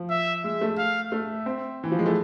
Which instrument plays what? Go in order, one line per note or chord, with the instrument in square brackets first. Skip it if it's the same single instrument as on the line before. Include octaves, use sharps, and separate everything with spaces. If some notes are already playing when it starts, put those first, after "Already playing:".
Already playing: [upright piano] F3
[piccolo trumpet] E5
[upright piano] G#3 [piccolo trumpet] E5
[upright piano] A3
[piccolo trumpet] F5
[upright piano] A3 [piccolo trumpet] E5
[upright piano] C4
E3
F3
G#3
A3